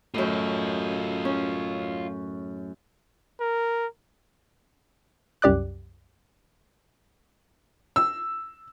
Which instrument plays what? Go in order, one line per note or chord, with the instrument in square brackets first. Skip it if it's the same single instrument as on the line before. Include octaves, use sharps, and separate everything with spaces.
[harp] F#2 A2 [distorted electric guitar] F4 D#5
[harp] C#4
[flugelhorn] A#4
[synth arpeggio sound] C2 F#2 G4 D5 D6 F#6
[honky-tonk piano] E6